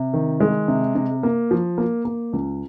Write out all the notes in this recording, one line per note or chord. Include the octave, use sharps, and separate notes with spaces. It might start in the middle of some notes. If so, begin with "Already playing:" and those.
Already playing: C3
D#3
G#3
C3
C3
A#3
F3
A#3
A#3
C#2